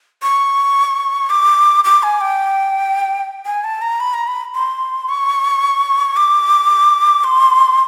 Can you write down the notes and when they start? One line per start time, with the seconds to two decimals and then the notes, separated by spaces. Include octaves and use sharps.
0.22 C#6
1.30 D6
1.84 D6
2.03 G#5
2.21 G5
3.46 G#5
3.64 A5
3.82 A#5
4.00 B5
4.14 A#5
4.27 B5
4.55 C6
5.09 C#6
6.17 D6
7.24 C6